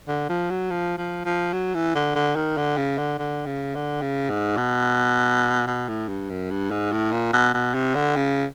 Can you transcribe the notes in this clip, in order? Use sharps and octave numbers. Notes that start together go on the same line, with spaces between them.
D3
F3
F#3
F3
F3
F3
F#3
E3
D3
D3
D#3
D3
C#3
D3
D3
C#3
D3
C#3
G#2
B2
B2
A2
G2
F#2
G2
G#2
A2
A#2
B2
B2
C3
D3
C#3